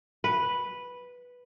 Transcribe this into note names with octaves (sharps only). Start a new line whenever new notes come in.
B4